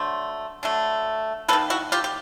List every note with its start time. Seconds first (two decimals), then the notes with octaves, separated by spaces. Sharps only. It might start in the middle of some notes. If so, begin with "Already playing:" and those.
Already playing: D3 F#3 A3 C5
0.63 D3 F#3 A3
1.48 F#3 A#3 A4 B4
1.53 D#3
1.70 E4 F#4
1.92 F4 G4
2.04 G4